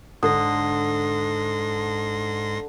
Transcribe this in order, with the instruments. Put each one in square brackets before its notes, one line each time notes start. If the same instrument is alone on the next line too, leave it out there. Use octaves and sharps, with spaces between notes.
[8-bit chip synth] G#2 C6 A#6 [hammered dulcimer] D3 [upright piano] A4 [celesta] D#6